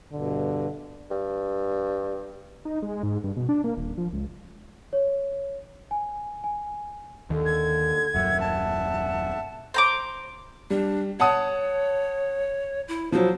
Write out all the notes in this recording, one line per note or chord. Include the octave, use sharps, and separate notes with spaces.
G2 B2 D3
G2
D#4
G#3
G#2
G2
B2
D4
A#3
D#1
F3
C#2
C#5
G#5
G#5
D#2 D3 D#3
G#6
D#1 F#2 E5 F#5
A5
C5 A#5 D6
G3 D4
C#5 F#5 A5 D#6
E4
F3 F#3 C5